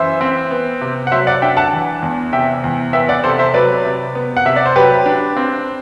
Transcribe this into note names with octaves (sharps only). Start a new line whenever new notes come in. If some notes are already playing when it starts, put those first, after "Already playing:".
Already playing: F#2 E3 C5 E5
C4
B3
C3
F#5
F#3 C5 E5
D5 F#5
D4 E5 G5
F#5 A5
E3
E2
C3 E5 G5
E2
B3 E5 G5
D5 F#5
C3 A4 C5
C5 E5
F#3 B4 D5
C3
B3
F#5
C3 E5
D5
C5
F#3 G4 B4
D4
C4